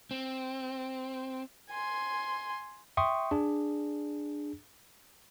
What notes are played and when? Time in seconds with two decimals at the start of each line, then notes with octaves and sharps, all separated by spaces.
0.11 C4
1.70 G#5 C6
2.97 E5 G5 C6 C#6 D#6
3.31 D4 G#4